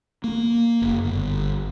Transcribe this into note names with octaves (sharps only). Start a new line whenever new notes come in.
A#3
F#1
G1